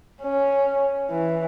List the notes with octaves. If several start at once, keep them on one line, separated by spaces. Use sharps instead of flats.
C#4
E3